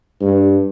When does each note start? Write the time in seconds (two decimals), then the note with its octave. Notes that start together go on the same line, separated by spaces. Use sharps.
0.21 G2